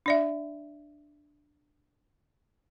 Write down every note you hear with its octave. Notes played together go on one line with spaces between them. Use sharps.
D4 D5 E5